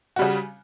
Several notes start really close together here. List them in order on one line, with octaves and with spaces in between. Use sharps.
F#4 G3 C#3